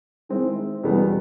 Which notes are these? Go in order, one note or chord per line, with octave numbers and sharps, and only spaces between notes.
D#3 G#3 C4 E4
E2 B2 G3 B3